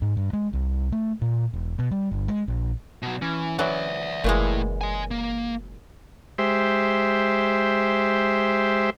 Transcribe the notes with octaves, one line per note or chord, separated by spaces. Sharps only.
G#2
G2
G#3
C2
A3
A#2
E1
B2
G3
G1
G#3
A#1
B2 F#3
E3 C#4
E3 F#3 D5 E5
F#1 A#2 E3 G#3 A3 E4
D#5 G#5
A#3
G#3 G4 C5 E5